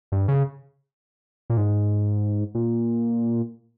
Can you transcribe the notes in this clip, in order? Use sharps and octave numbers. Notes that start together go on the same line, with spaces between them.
G2
C#3
A#2
G#2
A#2